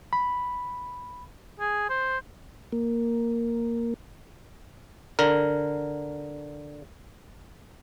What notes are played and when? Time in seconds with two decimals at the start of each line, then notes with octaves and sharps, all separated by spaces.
0.13 B5
1.60 G#4
1.90 C5
2.72 A#3
5.19 D3 A#4